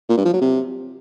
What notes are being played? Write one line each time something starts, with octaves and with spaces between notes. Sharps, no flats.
A#2
G2
F3
F#3
C3